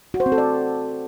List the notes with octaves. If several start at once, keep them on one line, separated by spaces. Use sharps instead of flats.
F#4
C5
C4
A4
D5